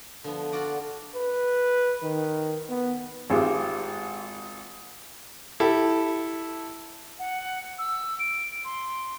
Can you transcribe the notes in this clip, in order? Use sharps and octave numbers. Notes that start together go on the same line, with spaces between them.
D3 F3 B3
F4 F#4 D5 F#5
B4
D#3
B3
G#1 G#2 F4 G4
E4 G4 A4
F#5
E6
D7
C6